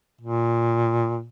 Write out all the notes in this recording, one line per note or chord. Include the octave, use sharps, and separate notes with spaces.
A#2